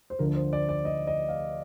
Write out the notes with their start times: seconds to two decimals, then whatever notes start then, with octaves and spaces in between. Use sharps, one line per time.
0.10 C5
0.19 D2 D3 F3 A#4
0.35 C5
0.53 D5
0.69 D5
0.85 D#5
1.07 D#5
1.29 F5